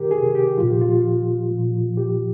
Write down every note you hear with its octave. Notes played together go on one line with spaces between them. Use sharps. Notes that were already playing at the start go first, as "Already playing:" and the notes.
Already playing: C3 D#3 G4 A#4
G#4
G4
A#2 F3 F4
G4
F4
A#2 F3
G4